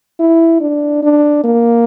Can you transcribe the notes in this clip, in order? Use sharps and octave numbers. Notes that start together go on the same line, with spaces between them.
E4
D4
D4
A#3